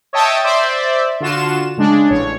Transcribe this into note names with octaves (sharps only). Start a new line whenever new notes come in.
C#5 D#5 E5 G5 A5
C5 D5 E5
D3 F4 F#4 E7
C#3 G#3 D4
A1 C#5